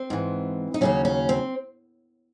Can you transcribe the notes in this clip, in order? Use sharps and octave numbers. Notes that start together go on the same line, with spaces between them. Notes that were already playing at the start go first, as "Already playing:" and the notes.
Already playing: C4
G#2 E3
D#4
D#2 C#3 F#3 C#4
C#4
C4